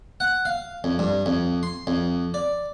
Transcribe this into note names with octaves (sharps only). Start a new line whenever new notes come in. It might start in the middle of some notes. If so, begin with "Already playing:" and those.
F#5
F5
F2
G2
F2
C6
F2
D5